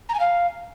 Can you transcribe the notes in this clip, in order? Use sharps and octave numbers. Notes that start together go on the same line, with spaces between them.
A#5
G#5
F5